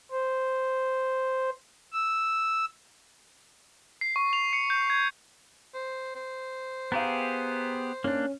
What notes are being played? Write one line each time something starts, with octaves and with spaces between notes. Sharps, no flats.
C5
E6
C7
C#6
F7
C#7
G6
G#6
C5
C5
B3 G4 G#4 F5 A#5
A#3 C#4 D4 C#5